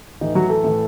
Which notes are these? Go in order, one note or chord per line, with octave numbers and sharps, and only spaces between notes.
A2 E3 D#4
F#3 F#4
A3 A4
A2 E3